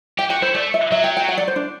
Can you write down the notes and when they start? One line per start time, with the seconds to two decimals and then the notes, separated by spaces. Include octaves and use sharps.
0.18 G4 G5
0.30 F#4 G5
0.42 E4 C5
0.54 A3 D5
0.74 E5
0.91 F#3 E5
1.04 G5
1.17 G5
1.29 F#5
1.38 D5
1.48 C5
1.56 D4